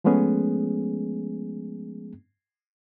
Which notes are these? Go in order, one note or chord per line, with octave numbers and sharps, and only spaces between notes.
F3 G#3 A3 B3 C#4 G#4